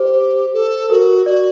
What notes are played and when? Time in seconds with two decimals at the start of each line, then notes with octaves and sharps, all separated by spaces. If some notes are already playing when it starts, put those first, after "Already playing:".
Already playing: G4 C5
0.54 A4
0.90 F#4 A#4
1.26 F#4 D5